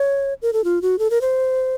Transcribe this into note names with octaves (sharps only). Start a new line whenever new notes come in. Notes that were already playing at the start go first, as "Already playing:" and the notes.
Already playing: C#5
A#4
A4
F4
F#4
A4
A#4
C5